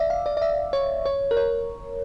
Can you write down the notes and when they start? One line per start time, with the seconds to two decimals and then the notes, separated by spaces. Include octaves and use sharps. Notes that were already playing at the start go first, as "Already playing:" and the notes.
Already playing: D5 E5
0.10 F5
0.26 D5
0.37 D5
0.42 E5
0.73 C#5
1.06 C#5
1.31 A#4
1.37 C#5